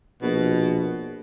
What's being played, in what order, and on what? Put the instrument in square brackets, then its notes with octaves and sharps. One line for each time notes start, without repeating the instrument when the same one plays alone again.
[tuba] A#1 [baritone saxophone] B2